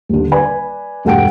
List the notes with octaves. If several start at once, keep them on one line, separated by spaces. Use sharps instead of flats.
D#1 D3
B4 D5 G#5 B5
E1 G2 A4 F#5 G5 D7